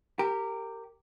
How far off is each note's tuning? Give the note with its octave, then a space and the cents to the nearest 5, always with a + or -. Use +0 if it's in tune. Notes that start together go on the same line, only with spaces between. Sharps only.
G4 +0 A#4 -20